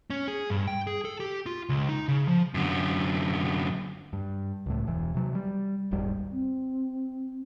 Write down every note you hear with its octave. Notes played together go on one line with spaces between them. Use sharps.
C#4
G#4
G2
G5
G#4
A4
G4
F4
C#2
D#4
C#3
F3
F#2 D3
G2
C#2 A2
E1 E3
C3 F#3
G3
D#1 G#1 G#2 G3
C4